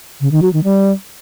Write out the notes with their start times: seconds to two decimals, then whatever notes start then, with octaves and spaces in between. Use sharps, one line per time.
0.21 C#3
0.32 D#3
0.42 F#3
0.53 D#3
0.64 G3